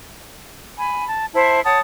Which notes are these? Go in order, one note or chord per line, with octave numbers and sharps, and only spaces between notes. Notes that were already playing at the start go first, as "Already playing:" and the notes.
G#5 B5
A5
E4 C5 E5 A5
C#5 F#5 A5 D#6